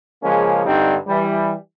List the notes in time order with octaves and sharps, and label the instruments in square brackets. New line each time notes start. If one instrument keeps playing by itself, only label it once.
[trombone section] C#3 F3 G#3 A#3 C#4
G2 D3 G3 C4 D#4
E3 G3